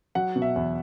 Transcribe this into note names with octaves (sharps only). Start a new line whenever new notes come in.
F#3 F#5
B2
E5
E2